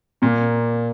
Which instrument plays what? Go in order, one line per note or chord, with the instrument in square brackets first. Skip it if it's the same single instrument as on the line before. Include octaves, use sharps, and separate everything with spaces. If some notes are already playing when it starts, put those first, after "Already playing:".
[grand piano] A#2 [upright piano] A#3